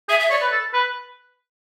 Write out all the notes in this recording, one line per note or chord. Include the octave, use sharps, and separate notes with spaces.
G#4 E5
E5
C#5 D5
B4
A4
B4